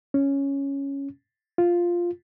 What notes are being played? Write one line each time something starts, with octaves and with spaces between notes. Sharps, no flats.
C#4
F4